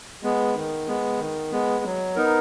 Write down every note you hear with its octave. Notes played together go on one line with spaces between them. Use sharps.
G#3 B3
D#3
G#3 B3
D#3
G#3 B3
F#3
B3 D#4 A#4